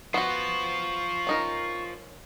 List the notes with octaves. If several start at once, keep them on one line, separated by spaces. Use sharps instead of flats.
B3 F4 F#4 C5 C#6
C#4 D#4 A#4